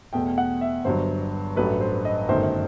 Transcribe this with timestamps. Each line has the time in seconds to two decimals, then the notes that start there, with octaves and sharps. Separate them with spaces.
0.13 E2 B2 A3 G5
0.38 F#5
0.61 E5
0.85 G1 G2 F#3 C5
1.56 A1 G2 F#3 A3 B4
1.81 C5
2.05 D#5
2.28 G1 F#2 D#3 A3 C5